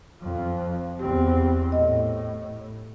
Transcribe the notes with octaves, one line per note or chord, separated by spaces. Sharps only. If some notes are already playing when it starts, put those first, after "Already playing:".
F2 F3
E2 C4 G4
A2 D#5